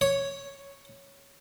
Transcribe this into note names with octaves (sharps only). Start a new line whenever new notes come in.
C#5